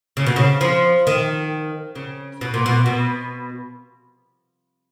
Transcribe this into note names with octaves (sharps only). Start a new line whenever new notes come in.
C#3
B2
C#3
F3
D#3
C#3
B2
A#2
B2
B2